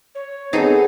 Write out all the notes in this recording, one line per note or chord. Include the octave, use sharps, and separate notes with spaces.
C#5
B3 C4 D#4 G#4 A4